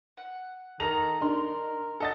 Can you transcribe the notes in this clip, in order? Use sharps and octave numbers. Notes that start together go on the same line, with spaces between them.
F#5
D#3 A4 A#5 F7
D4 D#4 A#4 C6
A4 D#5 F#5 A6